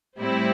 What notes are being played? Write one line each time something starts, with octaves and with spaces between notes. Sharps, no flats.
A2 G3 C4 E4